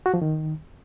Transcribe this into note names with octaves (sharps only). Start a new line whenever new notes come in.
F#4
F3
D#3